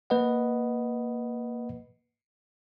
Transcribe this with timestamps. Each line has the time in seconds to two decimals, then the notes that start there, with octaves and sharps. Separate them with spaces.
0.10 A#3 B4 D#5 F#5